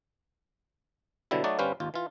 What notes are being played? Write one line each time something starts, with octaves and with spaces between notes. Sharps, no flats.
B2 D3 F#3 G3 E4
F#3 A3 D#4 F#4 D5
G1 G3 C#4 B4 C5 F5
G#1 D#2 F4
E3 F4